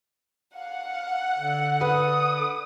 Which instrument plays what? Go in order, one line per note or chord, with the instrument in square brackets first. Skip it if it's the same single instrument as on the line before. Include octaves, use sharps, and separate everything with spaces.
[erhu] F5 [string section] F#5
[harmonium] D3
[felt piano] B4 [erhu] D#6